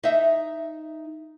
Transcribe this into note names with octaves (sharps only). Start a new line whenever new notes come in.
D#4 E5